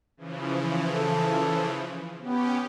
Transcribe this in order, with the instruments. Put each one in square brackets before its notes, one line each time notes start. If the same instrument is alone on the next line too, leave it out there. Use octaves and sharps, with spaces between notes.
[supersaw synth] C#3 E3 F3
[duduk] A4
[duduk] B3 [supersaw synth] C#4 G4